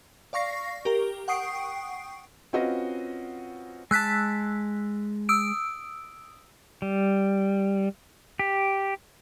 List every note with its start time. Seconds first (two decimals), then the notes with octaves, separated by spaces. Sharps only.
0.33 D5 F5 C#6 A#6 C7
0.85 G4 A#4
1.28 F#5 G5 C#6 D#6 C7 D7
2.53 C4 C#4 F4 F#4 B4 D#5
3.91 G#3 A5 E6 F#6 B6
5.29 D#6 E6 D7
6.82 G3
8.39 G4